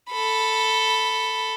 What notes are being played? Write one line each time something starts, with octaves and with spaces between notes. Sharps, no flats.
A4 B5